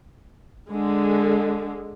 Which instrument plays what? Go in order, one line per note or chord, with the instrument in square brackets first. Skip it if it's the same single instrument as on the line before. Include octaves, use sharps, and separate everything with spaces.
[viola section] D3 G#3